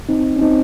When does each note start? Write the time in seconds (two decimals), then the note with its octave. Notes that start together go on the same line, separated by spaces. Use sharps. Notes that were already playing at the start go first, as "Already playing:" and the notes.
0.09 C4 D#4
0.36 C#4
0.42 C4 D#4